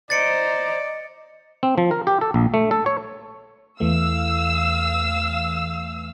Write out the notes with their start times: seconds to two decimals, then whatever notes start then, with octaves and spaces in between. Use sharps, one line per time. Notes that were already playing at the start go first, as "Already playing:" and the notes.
0.10 C5 D5 D#5 A#5 A6 C#7 D7
1.63 C4
1.78 F3
1.91 A#4
2.07 G4
2.21 A4
2.34 A#1
2.54 A3
2.71 A4
2.86 C#5
3.80 E2 E3 A3 F5 E6